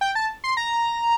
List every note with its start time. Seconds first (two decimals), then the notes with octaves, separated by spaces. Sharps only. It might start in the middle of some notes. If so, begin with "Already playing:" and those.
0.01 G5
0.15 A5
0.44 C6
0.57 A#5